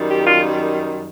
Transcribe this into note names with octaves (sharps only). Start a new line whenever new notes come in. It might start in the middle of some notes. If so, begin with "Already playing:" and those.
Already playing: F#2 D#3 G3
G4
F4